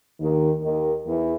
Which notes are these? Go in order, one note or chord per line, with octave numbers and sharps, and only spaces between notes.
D#2 D#3
D#2 D#3
E2 E3